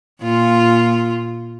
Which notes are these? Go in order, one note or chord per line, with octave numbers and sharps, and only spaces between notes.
A#2 F4